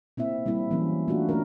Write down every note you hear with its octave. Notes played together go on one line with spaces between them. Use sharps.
A#3 C4 E4 E5
G3 A#3 C4 E4
E3 F#3 A#3 C4 C#4
A3 A#3 D4 F4 F#4
A3 C#4 D4 A#4